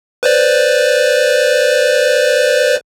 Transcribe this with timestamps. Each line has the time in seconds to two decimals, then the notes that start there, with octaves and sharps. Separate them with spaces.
0.23 B4 C5 D5